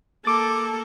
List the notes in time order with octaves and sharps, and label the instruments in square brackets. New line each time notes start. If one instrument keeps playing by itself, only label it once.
[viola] A#3 A4 [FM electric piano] D6 A6